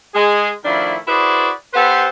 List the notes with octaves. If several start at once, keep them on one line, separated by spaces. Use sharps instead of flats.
G#3 G#4
D#3 F3 A3 D4 E4
E4 F#4 G#4 B4 C5 D5
B3 G4 A4 B4 C5